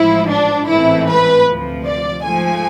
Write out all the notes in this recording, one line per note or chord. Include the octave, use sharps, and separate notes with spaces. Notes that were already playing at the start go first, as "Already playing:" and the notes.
Already playing: A1 G#2 F3 E4
D4
A1 G#2 E3 A3 C4 E4
B4
D2 C3 F3
D5
G#2 F3 A3 G#5